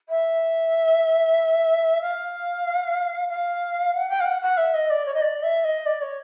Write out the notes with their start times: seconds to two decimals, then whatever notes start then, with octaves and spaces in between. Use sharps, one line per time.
0.09 E5
2.02 F5
3.29 F5
3.93 F#5
4.09 G5
4.20 F5
4.25 F#5
4.42 F#5
4.57 E5
4.74 D#5
4.90 D5
5.06 C#5
5.14 D#5
5.22 D5
5.43 E5
5.64 D#5
5.86 D5
6.01 C#5